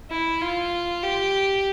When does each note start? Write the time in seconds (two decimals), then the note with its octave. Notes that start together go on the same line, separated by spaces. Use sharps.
0.10 E4
0.41 F4
1.02 G4